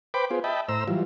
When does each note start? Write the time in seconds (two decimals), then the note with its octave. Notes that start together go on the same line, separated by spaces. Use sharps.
0.14 B4 C5 G5 B5 D6
0.31 B3 F4 G#4 C5
0.44 D#5 E5 G5 A5 B5
0.69 A2 C5 A#5 E6
0.88 E3 F#3 G3 F4